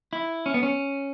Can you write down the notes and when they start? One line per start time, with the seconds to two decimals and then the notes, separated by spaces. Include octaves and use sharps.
0.13 E4
0.46 C#4
0.54 B3
0.63 C#4